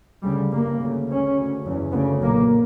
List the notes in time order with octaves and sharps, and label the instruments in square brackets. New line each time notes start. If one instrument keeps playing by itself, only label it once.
[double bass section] D2 C#3 G3
G1 G2 A#3
D2 C#3
C#2 C#3 C#4
D2 C#3
F#1 E2 C#3
D2 C#3 B3
B1 A#2 A#3